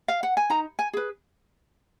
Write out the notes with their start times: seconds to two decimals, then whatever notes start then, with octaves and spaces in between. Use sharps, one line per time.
0.08 F5
0.23 F#5
0.37 G#5
0.50 D#4 A#5
0.79 G#5
0.93 G#4 B4